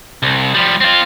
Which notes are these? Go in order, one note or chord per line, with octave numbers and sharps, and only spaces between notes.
C2
F3 G3
C4 F4